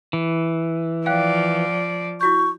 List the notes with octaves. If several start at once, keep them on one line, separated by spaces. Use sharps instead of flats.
E3
F3 D5 F5 G5 F#6
E4 F#4 C#6 G6